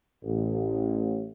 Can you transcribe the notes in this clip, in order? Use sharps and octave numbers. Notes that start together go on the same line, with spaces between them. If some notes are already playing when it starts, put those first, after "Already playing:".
A1